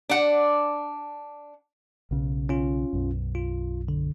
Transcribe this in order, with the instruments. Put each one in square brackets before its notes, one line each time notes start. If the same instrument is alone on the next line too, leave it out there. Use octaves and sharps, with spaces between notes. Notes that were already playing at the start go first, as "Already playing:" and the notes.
[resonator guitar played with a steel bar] D4 F#5
[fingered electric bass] B1 C#3
[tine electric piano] C#4 F4
[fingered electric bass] B1 F#2
[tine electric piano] F4
D3